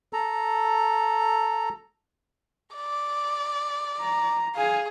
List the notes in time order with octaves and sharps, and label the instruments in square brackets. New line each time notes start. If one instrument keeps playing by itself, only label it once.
[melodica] A4 A#5
[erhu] D5
[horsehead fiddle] A#5
[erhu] G#4 [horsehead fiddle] F5 G#5